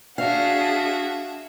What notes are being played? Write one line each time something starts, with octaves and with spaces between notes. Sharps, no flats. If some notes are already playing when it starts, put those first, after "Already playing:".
D4 F#4 G#4 E5 F5